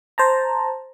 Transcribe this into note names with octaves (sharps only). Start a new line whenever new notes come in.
C5 A5 A#5